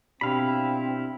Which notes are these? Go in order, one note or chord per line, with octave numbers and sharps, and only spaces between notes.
B2 C4 D4 E4 G4 F5 B5